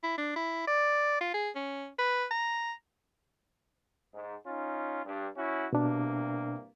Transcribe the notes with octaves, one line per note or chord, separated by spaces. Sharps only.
E4
D4
E4
D5
F4
G#4
C#4
B4
A#5
G#2
C#4 D#4 F4
G2
C#4 E4 F#4
C2 G2 B2 A#3 D4